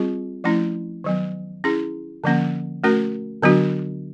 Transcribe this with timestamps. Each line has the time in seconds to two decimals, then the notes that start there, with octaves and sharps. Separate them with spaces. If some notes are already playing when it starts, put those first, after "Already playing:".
Already playing: G3 C4 F4 G#4
0.44 F3 A3 C#4 E4
1.04 D#3 F#3 B3
1.64 C#4 E4 G#4
2.24 D3 F3 A#3 C#4
2.84 A3 C#4 F#4 A#4
3.42 D3 F#3 B3 D4 F#4